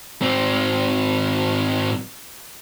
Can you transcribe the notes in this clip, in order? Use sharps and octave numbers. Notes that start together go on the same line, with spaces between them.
G#2 C4